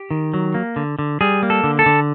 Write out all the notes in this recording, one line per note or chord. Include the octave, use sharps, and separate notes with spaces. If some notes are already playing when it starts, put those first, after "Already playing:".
Already playing: G4
D#3
F#3
A#3
D3
D3
G3 G#4
A#3
A4
D3
A4
D3